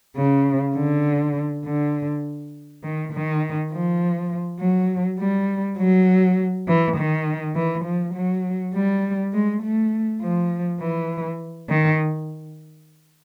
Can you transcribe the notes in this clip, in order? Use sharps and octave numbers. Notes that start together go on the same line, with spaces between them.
C#3
D3
D3
D#3
D#3
F3
F#3
G3
F#3
E3
D#3
E3
F3
F#3
G3
G#3
A3
F3
E3
D#3